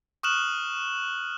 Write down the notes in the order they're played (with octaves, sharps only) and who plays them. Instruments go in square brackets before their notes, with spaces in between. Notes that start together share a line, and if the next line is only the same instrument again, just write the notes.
[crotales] C#6 D#6 F6 F#6 E7 F#7